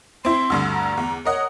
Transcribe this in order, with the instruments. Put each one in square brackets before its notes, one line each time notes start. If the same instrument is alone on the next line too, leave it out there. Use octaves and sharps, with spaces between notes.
[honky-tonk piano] C4 E4 [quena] C6
[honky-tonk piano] D2 G2 D3
[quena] A#5
[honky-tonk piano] E2
[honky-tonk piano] A#4 D#5 F#5 [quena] C#5